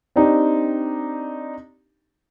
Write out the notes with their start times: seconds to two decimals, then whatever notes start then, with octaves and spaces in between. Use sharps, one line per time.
0.16 C4 D4 D#4 G4